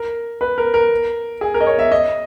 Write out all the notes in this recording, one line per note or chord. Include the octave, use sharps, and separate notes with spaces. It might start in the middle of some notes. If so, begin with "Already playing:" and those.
Already playing: A#4
B4
A#4
A#4
G#4
A#4
D#5
C#5
E5
D#5